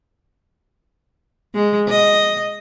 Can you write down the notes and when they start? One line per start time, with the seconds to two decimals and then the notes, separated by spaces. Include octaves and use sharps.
1.55 G#3
1.89 D#5